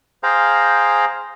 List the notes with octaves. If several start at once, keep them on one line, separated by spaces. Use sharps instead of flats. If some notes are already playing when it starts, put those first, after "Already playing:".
G#4 C5 F5 G5 A#5